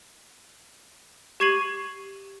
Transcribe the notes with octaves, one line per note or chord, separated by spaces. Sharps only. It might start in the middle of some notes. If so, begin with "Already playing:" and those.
G4 C#6 G#6 C7 D#7 F#7